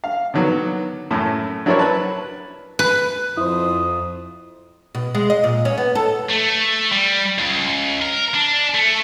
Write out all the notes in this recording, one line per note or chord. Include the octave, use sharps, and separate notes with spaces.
F5
D3 D#3 F#3 B3
F#2 A2 A3
F#3 D4 E4 A#4 C5 C#5
B4 A5
B4
F2 E4 C5 D#6
B2
G#3
D#5
A#2
C#4
B3
A4
A3
G3
C#2
A#4
D4
A3